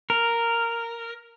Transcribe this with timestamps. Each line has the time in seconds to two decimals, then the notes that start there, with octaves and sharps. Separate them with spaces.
0.10 A#4